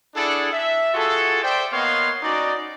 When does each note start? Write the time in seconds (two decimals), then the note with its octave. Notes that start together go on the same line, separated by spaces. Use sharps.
0.15 D4 E4 G#4 A4 D5 F#5
0.53 E5
0.94 F4 F#4 G#4 A4
1.43 C5 D5 E5 G5
1.73 A#3 B3 C#5 D#5 F5 C6
2.23 C#4 D#4 F#4 D5